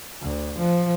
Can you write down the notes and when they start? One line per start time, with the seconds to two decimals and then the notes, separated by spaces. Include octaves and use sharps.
0.22 D2
0.58 F3